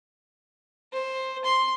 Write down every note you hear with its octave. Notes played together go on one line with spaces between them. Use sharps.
C5
C6